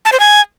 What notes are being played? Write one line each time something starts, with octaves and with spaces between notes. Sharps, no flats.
A5
C5
G#5